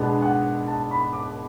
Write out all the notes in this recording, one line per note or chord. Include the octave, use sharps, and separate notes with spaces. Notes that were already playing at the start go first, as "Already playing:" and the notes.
Already playing: B2 G#3 B3 D4
F#5
A5
B5
D6